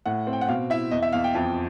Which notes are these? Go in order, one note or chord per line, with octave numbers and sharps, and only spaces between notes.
A2 F#5
C4
G5
F#5
B2 F5
E4 E5
E2 D#5
E5
E2 F5
G5
F2